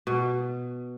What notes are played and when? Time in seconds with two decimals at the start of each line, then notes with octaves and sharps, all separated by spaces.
0.07 B2